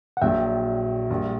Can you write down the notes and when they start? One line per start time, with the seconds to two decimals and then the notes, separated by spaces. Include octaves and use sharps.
0.17 F#5
0.22 A#1 A#2 F#3 E5 G5
1.09 A#1 A#2 G3